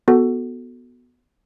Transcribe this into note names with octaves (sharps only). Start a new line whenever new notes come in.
B3 F#4 A4